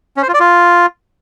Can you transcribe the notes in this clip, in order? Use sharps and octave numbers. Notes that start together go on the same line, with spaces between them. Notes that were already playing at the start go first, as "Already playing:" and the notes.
C#4
C5
F4
D5
F4